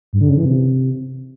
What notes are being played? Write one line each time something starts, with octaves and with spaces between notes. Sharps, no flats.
G2
D3
C#3
E3
C3